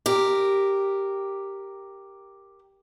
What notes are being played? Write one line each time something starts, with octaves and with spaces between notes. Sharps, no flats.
G4 A#4